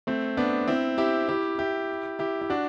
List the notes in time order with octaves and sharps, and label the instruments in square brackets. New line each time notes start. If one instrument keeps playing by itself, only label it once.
[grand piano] A3 C4
B3 D4
C4 E4
E4 G4
E4 G4
E4 G4
E4 G4
E4
D4 F#4